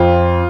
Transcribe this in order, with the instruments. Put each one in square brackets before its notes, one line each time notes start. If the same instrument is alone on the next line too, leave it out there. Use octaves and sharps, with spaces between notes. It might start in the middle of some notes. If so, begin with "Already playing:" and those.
Already playing: [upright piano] F2 F4